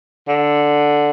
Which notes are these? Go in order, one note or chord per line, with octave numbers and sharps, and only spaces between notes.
D3